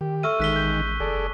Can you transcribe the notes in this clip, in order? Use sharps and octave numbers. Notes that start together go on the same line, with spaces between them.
D#3 G4
A4 E5 C#6 E6 F6 D#7
A1 D#3 G#3 F#6 B6 G7
G6
F#1 G#4 A4 D5